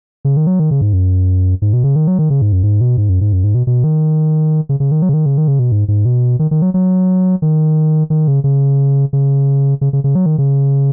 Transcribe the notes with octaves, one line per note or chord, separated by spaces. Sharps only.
C#3
D#3
F#3
D#3
C#3
G#2
F#2
G#2
B2
C#3
D#3
F#3
D#3
C#3
G#2
F#2
G#2
B2
G#2
F#2
G#2
F#2
G#2
B2
B2
D#3
C#3
C#3
D#3
F#3
C#3
D#3
C#3
D#3
C#3
B2
G#2
G#2
B2
D#3
D#3
F#3
F#3
D#3
D#3
C#3
C#3
C#3
C#3
C#3
C#3
F#3
D#3
C#3